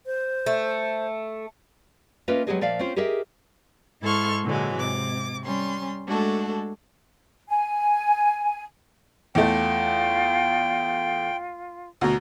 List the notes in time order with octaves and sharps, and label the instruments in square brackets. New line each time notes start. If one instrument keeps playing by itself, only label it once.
[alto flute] C5
[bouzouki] A3
[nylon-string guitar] A#3 C#4 F4 B4 D#5 E5
F#3 G#3 B3 G4 G#4 D#5
A#2 F3 D5 E5 F5
C4 C#4 F4 C5
G4 G#4 A#4 D#5 E5
[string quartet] G#2 E4 A4 C6 C#6 F6
A#2 D3 E3 F#3 G#3
G#2 C3 D6
G3 C#4 C6
G#3 A3 D4 F#4 A4
[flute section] G#5
[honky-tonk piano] E2 A3 [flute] F4 [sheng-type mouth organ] G5
[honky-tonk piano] D2 B2 [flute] A#5